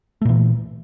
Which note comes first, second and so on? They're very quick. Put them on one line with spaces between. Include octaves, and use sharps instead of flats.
A3 A#2 E3